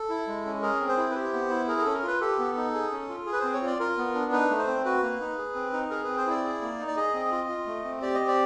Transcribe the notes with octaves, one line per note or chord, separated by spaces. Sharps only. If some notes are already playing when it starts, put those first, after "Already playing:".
Already playing: A4
E4
G#3
C#4
G#4 A#4
C4
C5
E4
B4
G4 C5
B3
E4
G#4 A#4
A#4
C#4 A4
A#4
F4 B4
G4 A4
B3
D#4
G#4
C#4
F4
G#4
B4
C4 C5
C#5
F4 D5
F4 A#4
B3
D4
D#4 B4
A3
C5
C4
F#4 B4
A#3
D#4
G#4
C4
D#4
G#4 A#4
C4 B4
C5
E4 D5
G#4
A#3
D#4
D5
G#4 D#5
C4
F4
F4
A3
C4
G4 D5
D#5
C4
D5